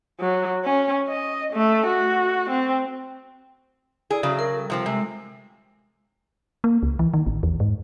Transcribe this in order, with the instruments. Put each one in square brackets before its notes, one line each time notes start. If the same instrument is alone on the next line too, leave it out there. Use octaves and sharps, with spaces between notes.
[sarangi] F#3
C#4
D#5
A3
F#4
C4
[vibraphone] E4 D5 [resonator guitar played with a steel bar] G#4
[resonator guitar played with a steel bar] C#3 F#3 [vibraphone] F#4 E5
[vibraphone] A#4
G3 A4
[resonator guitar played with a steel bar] C3 F3 C4
[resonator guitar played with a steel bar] C3 [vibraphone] G#3 G#5
[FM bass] A#3
C#2
E3
D#3
A1
E2
G#2